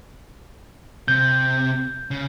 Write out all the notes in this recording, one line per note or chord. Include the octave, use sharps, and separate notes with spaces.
C3 G6
C#3